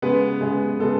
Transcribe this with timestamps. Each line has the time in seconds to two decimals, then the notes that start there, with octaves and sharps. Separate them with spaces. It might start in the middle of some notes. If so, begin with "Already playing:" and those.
0.02 C#3 G#3 B3 B4
0.41 C#3 G#3 B3
0.79 C#3 G#3 B3 A4